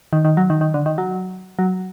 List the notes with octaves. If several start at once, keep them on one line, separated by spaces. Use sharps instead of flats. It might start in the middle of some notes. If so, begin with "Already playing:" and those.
D#3
D#3
F#3
D#3
D#3
D3
D#3
F#3
F#3